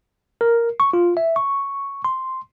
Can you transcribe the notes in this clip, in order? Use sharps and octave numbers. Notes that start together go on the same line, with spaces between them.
A#4
C#6
F4
E5
C#6
C6